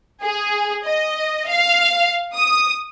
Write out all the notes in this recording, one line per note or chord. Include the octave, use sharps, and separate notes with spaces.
G#4
D#5
F5
D#6